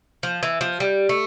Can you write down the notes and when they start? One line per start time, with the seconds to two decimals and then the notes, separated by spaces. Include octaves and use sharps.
0.23 F3
0.43 E3
0.61 F3
0.80 G3
1.09 A3